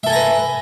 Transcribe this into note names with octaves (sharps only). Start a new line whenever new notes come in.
A4 B4 E5 G#5 A#5